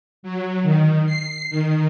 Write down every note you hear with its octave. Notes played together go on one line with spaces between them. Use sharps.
F#3
D#3
C7
D#3